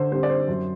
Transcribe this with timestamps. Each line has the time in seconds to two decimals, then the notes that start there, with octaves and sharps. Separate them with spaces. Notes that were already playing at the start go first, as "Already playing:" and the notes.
Already playing: D3 C5
0.11 G3 C4 C5
0.23 D5
0.30 C5
0.48 F#2